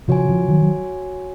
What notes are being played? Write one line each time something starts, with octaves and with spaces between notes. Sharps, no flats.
C#3 F3 F#4 C#5 G#5
C#3 F3
D#3 F#3
F#3